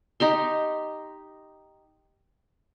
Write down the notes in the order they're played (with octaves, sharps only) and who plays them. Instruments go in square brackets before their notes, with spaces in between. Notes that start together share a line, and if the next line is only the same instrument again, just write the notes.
[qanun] D#4 G4 C6